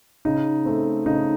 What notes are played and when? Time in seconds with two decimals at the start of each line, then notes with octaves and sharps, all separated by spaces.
0.25 C#3 D#4
0.65 A3 C4
1.06 C#3 D#4